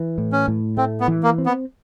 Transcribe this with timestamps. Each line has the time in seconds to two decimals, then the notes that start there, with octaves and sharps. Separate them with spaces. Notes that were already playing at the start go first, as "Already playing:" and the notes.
Already playing: E3
0.18 A2
0.33 C#4
0.48 A2
0.77 A3 C4
1.00 B3
1.08 E3
1.23 A#3
1.38 C4
1.46 B3